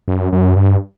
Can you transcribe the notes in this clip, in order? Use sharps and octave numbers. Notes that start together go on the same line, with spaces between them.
F#2
F#2
G2